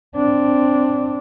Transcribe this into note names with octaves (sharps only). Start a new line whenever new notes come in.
C4 D4